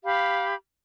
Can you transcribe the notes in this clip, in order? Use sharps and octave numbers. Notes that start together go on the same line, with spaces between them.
G4 F5 B5